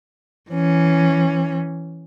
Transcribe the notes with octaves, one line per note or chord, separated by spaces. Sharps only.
E3 C#4